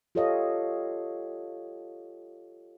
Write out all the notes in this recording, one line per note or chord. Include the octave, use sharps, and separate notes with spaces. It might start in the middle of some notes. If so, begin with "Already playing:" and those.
F4 G4 A4 C#5 D#5 F5